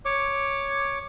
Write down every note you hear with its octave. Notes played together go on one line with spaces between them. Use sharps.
C#5 D6